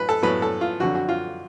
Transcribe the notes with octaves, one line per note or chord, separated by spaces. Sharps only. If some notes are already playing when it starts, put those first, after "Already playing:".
Already playing: A2 F#3 B4
A4
A2 F#3 B3 B4
A4
F4
F2 D3 F#3 F#4
F#4
F4